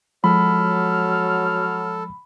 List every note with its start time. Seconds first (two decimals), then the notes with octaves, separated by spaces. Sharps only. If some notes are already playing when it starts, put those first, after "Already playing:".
0.24 F3 F#3 G#3 A4 B5 F6